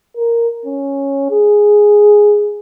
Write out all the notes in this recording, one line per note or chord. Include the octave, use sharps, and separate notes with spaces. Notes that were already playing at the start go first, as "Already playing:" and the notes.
A#4
C#4
G#4